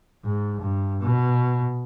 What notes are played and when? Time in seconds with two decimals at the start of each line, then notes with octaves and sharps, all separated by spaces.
0.25 G#2
0.61 G2
1.01 B2